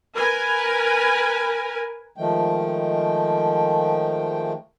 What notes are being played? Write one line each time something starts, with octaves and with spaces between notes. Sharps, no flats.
A#4 B4 G#5
D#3 F3 G#3 A3 G5